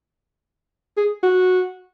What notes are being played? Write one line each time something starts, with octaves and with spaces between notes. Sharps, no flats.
G#4
F#4